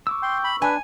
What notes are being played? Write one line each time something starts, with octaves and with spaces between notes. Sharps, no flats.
C#6 D6 E6
G5 C6
B5
D4 B4 G#5